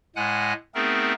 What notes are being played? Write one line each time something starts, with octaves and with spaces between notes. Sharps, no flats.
A2 G#3 F#5 G#5 F#6
A3 B3 C4 D#4 G#4 A#4